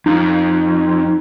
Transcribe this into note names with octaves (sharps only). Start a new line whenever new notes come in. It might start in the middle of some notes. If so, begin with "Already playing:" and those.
F2 D#4